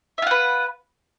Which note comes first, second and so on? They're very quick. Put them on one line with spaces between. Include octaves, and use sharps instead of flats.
E5 F4 F#5 B4